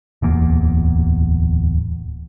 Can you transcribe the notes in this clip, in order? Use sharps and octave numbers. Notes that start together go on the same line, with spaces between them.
D1 E2 A#3